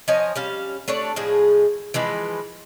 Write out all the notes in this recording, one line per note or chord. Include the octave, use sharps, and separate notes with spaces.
F3 C#5 D#5 G#5
G3 C#4 F5
A3 D4 C#5 D5
A2 F3 G#3 G#4
E3 F3 G#3 B4